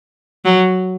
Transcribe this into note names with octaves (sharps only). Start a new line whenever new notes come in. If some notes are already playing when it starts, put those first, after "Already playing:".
F#3